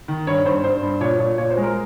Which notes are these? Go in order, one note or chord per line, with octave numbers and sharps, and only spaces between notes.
D#3
G2 C#5
G2 C5
G2 C5
G2
A#2 C#5
A#2
A#2 C#5
C5
G#3
A#4